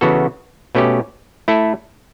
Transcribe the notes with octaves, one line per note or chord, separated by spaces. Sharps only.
C#3 E3 B3 F#4 A4
B2 A3 C#4 G4
A3 E4 A4